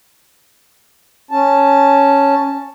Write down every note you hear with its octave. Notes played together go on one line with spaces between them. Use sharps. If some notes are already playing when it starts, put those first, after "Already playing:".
C#4 A5